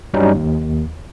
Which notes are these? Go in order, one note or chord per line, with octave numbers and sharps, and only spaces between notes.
G2 F#3 G3 C#4 D#4
D#2